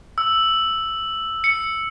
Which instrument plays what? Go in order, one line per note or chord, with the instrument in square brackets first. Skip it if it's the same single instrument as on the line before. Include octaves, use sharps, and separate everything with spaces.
[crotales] E6
C#7